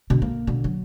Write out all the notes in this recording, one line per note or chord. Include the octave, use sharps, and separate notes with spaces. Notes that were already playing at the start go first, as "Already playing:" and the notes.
B2 D3
A#3
B2 D3
F#3